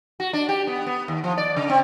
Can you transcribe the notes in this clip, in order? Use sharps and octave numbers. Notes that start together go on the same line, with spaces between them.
F#4
D4
G4
B3
B3
D#2
F3
D5
C#3
C4